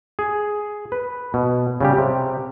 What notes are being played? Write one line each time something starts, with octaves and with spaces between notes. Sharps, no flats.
G#4
B4
B2
C#3 G3 G4
C3